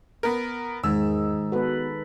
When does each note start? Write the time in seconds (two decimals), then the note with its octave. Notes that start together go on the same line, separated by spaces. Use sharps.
0.23 B3 A#4
0.84 E2 G#2 D#3 G#3 D#4 E6
1.52 B3 F#4 A4 B4